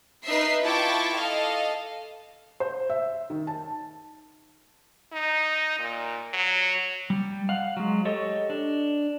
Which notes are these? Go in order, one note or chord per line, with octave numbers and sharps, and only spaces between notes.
D#4 B4 D#5 E5 C7
E4 F4 G5 A5 C#6 D6
A4 D#5 F5
C5
E5
D#3
A5
D#4
A#2
F#3
G3
F5 F#5
F#3 G#3
G4 A4 C#5 D#5
D4